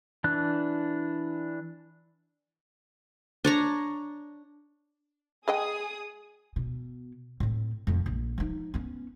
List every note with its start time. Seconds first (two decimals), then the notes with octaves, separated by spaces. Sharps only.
0.24 E3 D4 F#6
3.45 D4 C#5 A#5
5.48 G#3 G#4 D#5 G5 D#6
6.56 B2
7.40 A2 C4
7.87 D1 F2
8.06 A#1
8.38 F3 D#4
8.74 B3 C#4